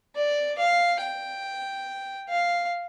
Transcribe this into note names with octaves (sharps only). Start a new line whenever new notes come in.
D5
F5
G5
F5